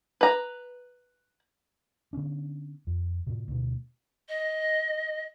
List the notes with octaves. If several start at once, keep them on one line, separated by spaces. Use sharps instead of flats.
B4 A#5
D3 B3 C#4 D4
F2
A2 C3
D2 B2
D#5